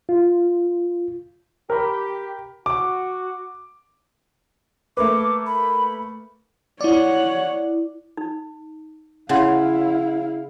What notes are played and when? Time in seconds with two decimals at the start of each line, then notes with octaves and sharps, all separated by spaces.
0.09 F4
1.70 G4 A#4 B5
2.66 F#4 D6
4.97 A3 A#3 B4 D6
5.46 B5
6.81 E4 C#5 D5 F#5
8.17 D#4
9.29 C#3 E4 C#5 F5 F#5 C6